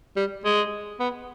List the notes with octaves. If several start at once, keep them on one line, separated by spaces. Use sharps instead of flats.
G3
G#3
B3